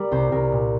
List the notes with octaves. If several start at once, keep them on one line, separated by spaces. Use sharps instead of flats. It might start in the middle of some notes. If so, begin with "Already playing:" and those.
Already playing: G3 A#4 D5
C2 C5
C2 A#4
A#2